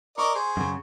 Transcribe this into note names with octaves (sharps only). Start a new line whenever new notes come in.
A#4 D5 D#5 C#6
G#4 C5
F#2 C#3